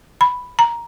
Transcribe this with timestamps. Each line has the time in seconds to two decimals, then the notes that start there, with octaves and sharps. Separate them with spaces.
0.21 B5
0.59 A#5